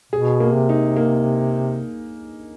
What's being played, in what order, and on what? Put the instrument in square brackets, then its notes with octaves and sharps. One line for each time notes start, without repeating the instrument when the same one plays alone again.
[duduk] B2 [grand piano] G#4
[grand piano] A#3
[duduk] C3
[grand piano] D#4
A#3